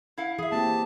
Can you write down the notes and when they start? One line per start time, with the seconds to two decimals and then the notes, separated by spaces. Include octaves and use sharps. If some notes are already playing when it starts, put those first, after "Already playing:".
0.18 E4 F5 F#5
0.38 E3 G#4 E5
0.52 A#3 C4 G4 A5